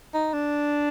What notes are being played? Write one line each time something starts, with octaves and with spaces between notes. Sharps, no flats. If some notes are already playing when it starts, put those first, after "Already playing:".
D#4
D4